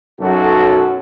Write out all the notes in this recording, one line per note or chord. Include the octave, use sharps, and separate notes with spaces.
B1 F#2 F#4 A4